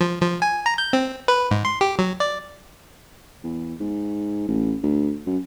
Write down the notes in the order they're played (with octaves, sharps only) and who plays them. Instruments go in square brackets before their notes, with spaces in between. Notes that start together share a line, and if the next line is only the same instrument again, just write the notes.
[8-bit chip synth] F3
F3
G#5
A#5
G6
C4
B4
G#2
C6
G4
F#3
D5
[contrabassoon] E2
G#2
A1
D2
F#2